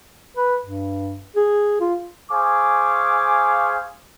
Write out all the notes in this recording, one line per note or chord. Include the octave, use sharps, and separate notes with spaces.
B4
G2
G#4
F4
G#4 C5 F5 G#5 C#6 D6